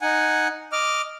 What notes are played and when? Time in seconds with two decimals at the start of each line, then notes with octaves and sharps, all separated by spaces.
0.01 D#4 F#5 G#5
0.72 D#5 D6 F6